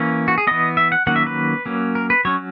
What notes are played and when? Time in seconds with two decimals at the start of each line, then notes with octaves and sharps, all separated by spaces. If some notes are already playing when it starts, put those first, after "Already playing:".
Already playing: E3 A#3 C#4
0.28 F#4
0.38 G#4
0.47 E3 B3 D#5
0.77 E5
0.92 F#5
1.07 D#3 F#3 A#3 C#4 F#5
1.16 E5
1.27 B4
1.66 F#3 A#3 C#4
1.95 A#4
2.10 B4
2.25 F#3 C#4 C#5